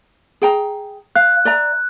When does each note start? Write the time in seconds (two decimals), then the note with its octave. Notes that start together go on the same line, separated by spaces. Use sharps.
0.42 G#4 G5 A#5
1.16 F5 F#6
1.45 D5 E5 A#5